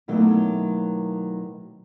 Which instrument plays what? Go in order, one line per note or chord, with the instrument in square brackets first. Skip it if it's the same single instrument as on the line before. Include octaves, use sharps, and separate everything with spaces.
[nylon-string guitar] B2 D#3 F#3 A3 A#3 E4